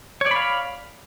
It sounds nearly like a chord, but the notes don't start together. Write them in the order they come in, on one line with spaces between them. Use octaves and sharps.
C#5 D5 B5 F5